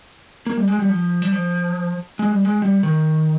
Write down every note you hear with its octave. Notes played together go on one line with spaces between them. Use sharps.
A#3
G3
G#3
G3
F3
G3
F3
G#3
G3
G#3
G3
D#3